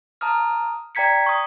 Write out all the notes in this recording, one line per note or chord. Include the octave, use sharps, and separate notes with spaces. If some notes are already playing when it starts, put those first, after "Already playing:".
A5 A#5 D#6 F6
D5 G5 A#5 G#6 B6 C#7
C#6 D#6